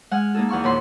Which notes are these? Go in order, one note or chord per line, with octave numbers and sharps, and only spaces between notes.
G#3 F#5 G#5 F6
A#3 D#4 G#4 A4
E2 F#5 C#6 F6
D#2 A#2 F#5 B5 C6